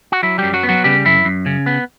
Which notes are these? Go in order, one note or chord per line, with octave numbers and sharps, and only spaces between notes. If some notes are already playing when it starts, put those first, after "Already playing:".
F#4
F#3 E4
F#2 G3 G4
F#3 F#4
B3
F#3 F#4
C#3 G3 G4
F#2 E4
F#2
C#3
B3